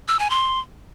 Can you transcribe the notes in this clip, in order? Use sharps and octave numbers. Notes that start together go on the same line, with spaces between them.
E6
G#5
C6